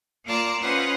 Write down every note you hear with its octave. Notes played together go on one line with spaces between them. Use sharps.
A#3 F4 A#4 D5 A5 A#5
C#4 F4 B4 C5 D#5 F#5